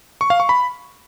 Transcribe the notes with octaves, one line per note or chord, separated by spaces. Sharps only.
C#6
F5
C#6
B5